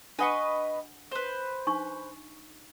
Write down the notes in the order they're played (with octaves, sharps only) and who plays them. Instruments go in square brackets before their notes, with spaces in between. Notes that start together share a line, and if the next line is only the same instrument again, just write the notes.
[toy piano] D4 F#5 [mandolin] B4 D#5 C#6
[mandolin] B4 C5
[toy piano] D4 D#4 C#6